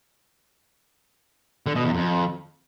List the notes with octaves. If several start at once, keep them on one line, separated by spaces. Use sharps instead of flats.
D3
B2
E2
F2